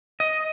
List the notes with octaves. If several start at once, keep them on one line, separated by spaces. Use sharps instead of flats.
D#5